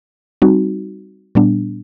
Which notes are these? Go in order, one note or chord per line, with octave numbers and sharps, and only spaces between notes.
G3 C4 D#4 F#4
A#2 G3 B3 D4